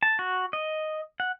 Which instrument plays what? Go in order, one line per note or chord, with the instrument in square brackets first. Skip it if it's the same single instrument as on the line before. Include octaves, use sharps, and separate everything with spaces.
[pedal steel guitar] A5
F#4
D#5
F#5